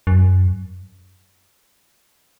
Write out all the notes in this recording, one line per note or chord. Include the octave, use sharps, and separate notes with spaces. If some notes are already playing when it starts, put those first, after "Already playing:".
F#2